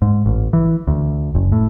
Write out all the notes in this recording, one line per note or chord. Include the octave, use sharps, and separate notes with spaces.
G#2
A1
E3
D2
F#1
A2